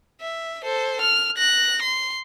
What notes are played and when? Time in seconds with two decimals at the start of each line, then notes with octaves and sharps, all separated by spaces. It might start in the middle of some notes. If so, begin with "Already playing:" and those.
0.21 E5
0.64 A4 C5
1.01 F6
1.38 F#6 A#6
1.82 C6